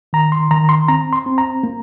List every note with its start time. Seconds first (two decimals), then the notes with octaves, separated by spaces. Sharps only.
0.13 D#3 A#5
0.32 C6
0.51 D#3 A#5
0.69 C6
0.88 C4 A#5
1.13 C6
1.26 C4
1.38 A#5
1.63 A#3